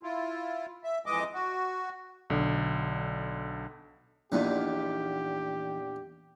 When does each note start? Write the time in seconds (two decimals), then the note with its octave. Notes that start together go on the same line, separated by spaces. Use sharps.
0.03 E4 F4
0.84 E5
1.06 F2 E3 G#3 D#5 D6
1.34 F#4
2.30 B1 D3
4.32 A#1 E2 A#2 E3 D#4 G4